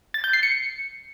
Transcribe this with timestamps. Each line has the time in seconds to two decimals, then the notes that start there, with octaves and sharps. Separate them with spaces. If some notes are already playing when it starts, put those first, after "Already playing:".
0.14 A6
0.24 G6
0.33 C7
0.43 C#7